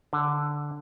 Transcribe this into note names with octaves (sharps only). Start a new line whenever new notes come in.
D3